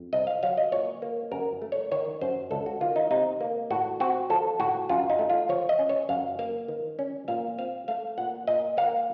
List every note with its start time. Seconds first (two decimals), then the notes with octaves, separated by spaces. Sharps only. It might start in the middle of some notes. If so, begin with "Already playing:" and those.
Already playing: F2
0.13 C2 D#5
0.27 F5
0.43 F#3 F5
0.57 D#5
0.72 A#2 C#5
1.02 A#3
1.32 F#2 A#4
1.62 A3
1.72 C#5
1.92 D#3 C#5
2.21 F#2 C5
2.51 C#2 A4
2.66 F#4
2.81 D#3 F4
2.96 D#4
3.11 C3 D#4
3.41 A#3
3.71 A2 F#4
4.00 C4 F#4
4.30 F3 A4
4.60 A2 F#4
4.89 F#2 F4
5.10 D#4
5.19 A3
5.30 F4
5.49 F3 C#5
5.69 D#5
5.79 C#4
5.89 C#5
6.09 F#2 F5
6.39 A#3 F5
6.68 D#3
6.99 C#4
7.28 A#2 F5
7.58 C4 F5
7.88 A3 F5
8.18 A#2 F#5
8.47 A#2 D#5
8.77 A#3 F5